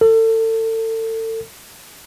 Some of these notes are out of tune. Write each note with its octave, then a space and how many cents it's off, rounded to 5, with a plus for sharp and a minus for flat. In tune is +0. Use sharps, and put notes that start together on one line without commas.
A4 +30